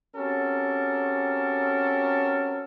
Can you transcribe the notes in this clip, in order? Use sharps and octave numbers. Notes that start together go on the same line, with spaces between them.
C4 C#4 F#4 G4 A4 A#4